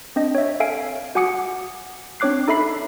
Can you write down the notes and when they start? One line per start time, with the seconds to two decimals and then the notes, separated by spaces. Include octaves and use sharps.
0.16 C4 D4 D#5
0.35 C#5 E5
0.60 A4 E5 F5 G#5 D7
1.15 F#4 F#5 G#5 D6 D#6 C#7
2.20 C4 D4 C#5 D6 F#6 C7
2.48 D#4 A4 E5 B5 C7